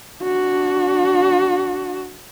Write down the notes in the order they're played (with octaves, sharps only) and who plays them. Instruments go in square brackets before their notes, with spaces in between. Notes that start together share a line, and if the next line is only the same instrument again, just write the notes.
[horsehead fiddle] D4 F#4